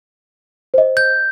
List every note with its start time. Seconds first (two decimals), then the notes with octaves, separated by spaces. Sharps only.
0.74 C5 D#5
0.97 G6